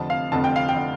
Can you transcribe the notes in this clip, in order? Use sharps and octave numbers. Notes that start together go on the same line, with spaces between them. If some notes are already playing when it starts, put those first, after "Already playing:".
Already playing: F1 F2 D3 A5
F5
F1 F2 D3 A5
G5
F5
G5
D3